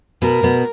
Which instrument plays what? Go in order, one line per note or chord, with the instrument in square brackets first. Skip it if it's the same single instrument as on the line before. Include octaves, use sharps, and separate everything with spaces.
[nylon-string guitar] B2 B3 [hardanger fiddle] A#4
[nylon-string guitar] B2 B3